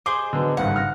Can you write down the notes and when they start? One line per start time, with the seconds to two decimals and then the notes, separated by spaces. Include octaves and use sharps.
0.06 G#4 C5 D#5 D6
0.33 D3 F#3 B3
0.57 G#1 G2 C#3 F#5
0.76 F6 A#6